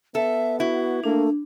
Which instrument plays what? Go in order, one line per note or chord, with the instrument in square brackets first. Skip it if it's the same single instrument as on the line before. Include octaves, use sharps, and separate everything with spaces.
[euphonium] B3 [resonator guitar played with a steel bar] A4 [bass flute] E5
[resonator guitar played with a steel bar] E4 [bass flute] F#4
[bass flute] A3 [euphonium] A#3 [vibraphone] D4